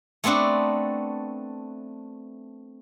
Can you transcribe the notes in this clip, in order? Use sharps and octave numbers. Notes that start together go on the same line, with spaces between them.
A3 B3 C4 D4 F#4